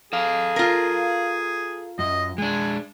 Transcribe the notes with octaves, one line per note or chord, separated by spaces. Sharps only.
G#4 A4 F5
F4 A#4
F#2 D#5
G#3 D4 G#5